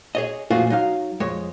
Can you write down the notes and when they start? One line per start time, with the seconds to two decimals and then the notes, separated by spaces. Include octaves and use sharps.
0.15 G#4 C#5 D#5
0.50 F2 A#2 A3 F4 F#4 G#4
0.70 F#3 D#4 F5
1.20 F2 G#3 C#5